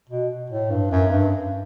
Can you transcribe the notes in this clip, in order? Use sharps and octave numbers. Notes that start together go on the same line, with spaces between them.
B2
A2
G2
F#2
G2